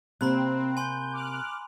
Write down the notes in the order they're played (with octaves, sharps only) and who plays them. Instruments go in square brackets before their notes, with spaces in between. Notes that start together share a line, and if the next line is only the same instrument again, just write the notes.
[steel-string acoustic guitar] C3 A#3 [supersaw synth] C4 [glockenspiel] A#5 B5 F#6
[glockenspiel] G#5 C6 [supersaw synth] G6
[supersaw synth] D6 F6 F#6